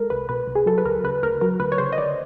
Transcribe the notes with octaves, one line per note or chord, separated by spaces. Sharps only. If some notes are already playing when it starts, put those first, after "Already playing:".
Already playing: G#3 A4 A#4
C2 B4
B2 B4
C2
G#4
F#3 A4
B4
D2 A#4
C#3 B4
D2 A#4
F#3 A#4
D2 B4
C#5
C#3 C5
D#5
D2 D5